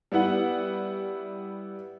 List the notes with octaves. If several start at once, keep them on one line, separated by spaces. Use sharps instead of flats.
G3 B3 E4 F#5